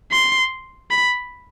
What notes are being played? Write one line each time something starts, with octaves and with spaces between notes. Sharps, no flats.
C6
B5